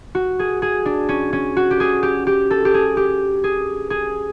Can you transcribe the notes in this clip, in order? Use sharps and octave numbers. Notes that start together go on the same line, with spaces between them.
F#4
G#4
G#4
D4
C#4
C#4
F#4
G4
G#4
G4
G4
A4
G4
G#4
G4
G#4
G#4